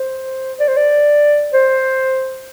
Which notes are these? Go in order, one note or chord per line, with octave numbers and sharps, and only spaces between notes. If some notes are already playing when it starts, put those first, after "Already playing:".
Already playing: C5
D5
C5
D5
C5